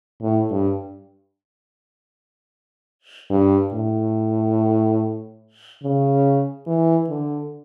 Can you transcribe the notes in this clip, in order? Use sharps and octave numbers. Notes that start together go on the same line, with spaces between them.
A2
G2
G2
A2
C#3
E3
D3